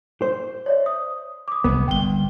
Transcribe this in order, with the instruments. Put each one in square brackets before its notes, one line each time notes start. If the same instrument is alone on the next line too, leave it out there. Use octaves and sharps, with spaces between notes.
[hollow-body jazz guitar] C5
[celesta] C#5 D5 E5
D#6
D6 D#6
[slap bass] C2 F#3 G#3 [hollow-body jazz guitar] B3
[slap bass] G1 [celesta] G5 G7